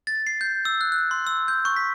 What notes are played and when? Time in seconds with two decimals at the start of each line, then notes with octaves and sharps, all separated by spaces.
0.07 A6
0.27 C7
0.41 G6
0.65 E6
0.81 F#6
0.92 F#6
1.11 C6
1.27 E6
1.48 G6
1.65 C#6
1.76 B6